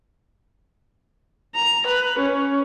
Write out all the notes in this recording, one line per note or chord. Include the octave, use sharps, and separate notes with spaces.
A#5
B4
C#4